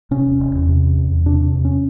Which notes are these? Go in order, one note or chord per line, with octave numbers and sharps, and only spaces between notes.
C3 C#4
E1
E1
E2
C3
E2
E2
E2
C3 D4
C3
E2
C#4